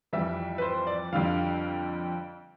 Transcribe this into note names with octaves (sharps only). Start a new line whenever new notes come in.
F2 E3 G3 E5
B4
C5
D5
F2 D3 G3 F5